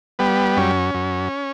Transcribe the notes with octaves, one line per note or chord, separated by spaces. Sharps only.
G3 B3
F#2 C#4
F#2